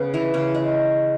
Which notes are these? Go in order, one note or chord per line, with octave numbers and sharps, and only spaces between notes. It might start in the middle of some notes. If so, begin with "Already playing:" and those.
Already playing: C#3 B3 C#4
E3 E4
C#3 C#4
G#3